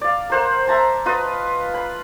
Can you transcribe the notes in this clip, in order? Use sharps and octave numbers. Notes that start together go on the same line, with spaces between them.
D5 F5
A#4 C5 F#5
E5 A5 A#5
F4 B4 D#5
B5